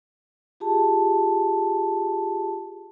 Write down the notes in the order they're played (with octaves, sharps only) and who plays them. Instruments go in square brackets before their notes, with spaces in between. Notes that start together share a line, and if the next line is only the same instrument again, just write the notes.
[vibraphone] F4 G4 G#4 A5